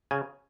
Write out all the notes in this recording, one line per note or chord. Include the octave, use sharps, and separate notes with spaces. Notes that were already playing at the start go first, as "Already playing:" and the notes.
C#3 G#5